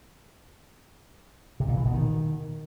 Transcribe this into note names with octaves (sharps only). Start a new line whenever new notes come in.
C3
A#2
E3
B2
D#3